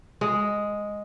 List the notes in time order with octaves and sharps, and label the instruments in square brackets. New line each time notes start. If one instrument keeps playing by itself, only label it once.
[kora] G#3